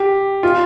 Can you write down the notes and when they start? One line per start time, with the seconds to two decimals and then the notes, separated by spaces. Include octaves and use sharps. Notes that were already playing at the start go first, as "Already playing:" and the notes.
Already playing: G4
0.43 F4